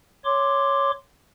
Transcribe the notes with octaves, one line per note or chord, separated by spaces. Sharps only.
C#5 C6 D6